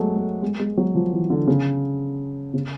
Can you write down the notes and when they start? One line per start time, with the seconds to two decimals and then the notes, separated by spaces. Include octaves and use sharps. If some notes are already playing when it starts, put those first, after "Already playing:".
Already playing: F#3 G#3 A3
0.16 A3
0.42 G#3
0.59 G#3
0.77 F#3
0.95 F3
1.13 E3
1.30 D3
1.47 C#3
2.54 C#3